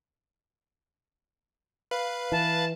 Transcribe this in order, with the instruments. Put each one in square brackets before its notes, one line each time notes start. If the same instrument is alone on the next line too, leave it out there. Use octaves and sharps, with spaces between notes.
[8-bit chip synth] B4 F5 B5
[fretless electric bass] E3 [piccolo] A5